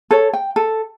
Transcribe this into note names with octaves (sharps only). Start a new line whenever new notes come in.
A4 C#5
G5
A4